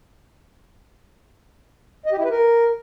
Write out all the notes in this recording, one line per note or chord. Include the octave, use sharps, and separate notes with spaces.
D#5
G4
E4
B4
A#4